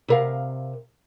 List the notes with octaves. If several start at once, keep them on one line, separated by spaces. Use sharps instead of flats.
C3 A#4 F5